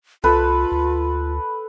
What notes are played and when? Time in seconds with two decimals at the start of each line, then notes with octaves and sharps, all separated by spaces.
0.24 C2 F4 A4 B4
0.72 D2